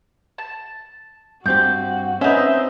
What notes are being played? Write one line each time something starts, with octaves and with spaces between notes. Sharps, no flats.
A5
G2 C4 F#4 G4 G6
C4 C#4 D#4 B4 E5